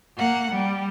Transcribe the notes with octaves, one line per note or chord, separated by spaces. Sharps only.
A#3 F#5
G3